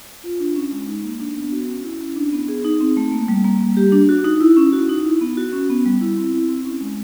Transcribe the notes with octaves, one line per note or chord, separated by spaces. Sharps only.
F4
D4
C#4
G#3
D#4
A#3
D4
B3
F#4
C#4
E4
C#4
D4
B3
G#4
D#4
C4
A3
A#3
G3
A#3
G3
G4
D4
F#4
D#4
E4
C#4
F#4
D#4
E4
B3
F#4
C#4
B3
G3
E4
C4
E4
C4
C#4
G#3